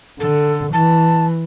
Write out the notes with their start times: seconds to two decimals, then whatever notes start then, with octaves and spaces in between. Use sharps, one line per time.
0.20 D3 A4
0.73 E3 A5